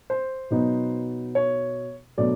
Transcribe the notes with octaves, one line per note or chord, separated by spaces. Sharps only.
C5
B2 F#3 B3 D#4
C#5
B2 F#3 A3 D4 D5